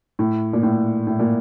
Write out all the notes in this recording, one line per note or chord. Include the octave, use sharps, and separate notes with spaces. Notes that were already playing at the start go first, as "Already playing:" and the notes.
A2
A#2
A2
A2
A#2